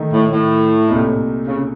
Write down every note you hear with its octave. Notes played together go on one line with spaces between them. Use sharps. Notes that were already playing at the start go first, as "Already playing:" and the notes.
Already playing: D#3 A3 D#4
A2
A2
C2 A#2 A3 D#4
C#3